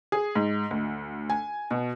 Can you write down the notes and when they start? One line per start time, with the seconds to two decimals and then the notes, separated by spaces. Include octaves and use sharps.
0.12 G#4
0.35 G#2
0.71 D2
1.30 G#5
1.71 B2